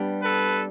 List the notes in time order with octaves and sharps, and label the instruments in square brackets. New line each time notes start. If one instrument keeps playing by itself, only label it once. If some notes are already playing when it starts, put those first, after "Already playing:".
Already playing: [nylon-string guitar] G3 B3 D4 G4
[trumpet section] A4 B4